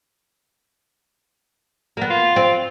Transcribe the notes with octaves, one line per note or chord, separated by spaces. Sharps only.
A#3 B3
F4
C4